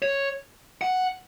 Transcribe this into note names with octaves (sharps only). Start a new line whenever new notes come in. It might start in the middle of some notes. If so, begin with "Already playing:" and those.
C#5
F#5